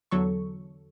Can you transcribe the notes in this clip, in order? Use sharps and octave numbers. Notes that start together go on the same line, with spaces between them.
E2 D3 F#3 A4 C#6